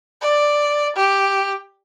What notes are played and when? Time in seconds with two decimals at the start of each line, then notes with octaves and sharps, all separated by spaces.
0.22 D5
0.96 G4